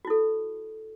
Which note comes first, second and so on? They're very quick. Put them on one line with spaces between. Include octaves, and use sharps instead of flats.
F#4 E4 A4